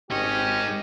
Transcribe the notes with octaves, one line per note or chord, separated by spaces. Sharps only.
G#1 G#2 C#4 G4 D#5